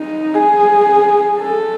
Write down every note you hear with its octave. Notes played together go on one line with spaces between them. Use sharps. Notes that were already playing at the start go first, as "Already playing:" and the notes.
Already playing: D#4
G#4
A4